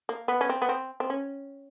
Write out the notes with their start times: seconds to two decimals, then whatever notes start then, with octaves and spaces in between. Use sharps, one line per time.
0.09 A#3
0.28 B3
0.41 C#4
0.49 C4
0.62 B3
0.69 C4
1.00 C4
1.10 C#4